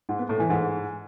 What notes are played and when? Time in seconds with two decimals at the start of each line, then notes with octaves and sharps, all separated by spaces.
0.09 G#2
0.19 B3
0.29 A2
0.40 E3
0.50 G#2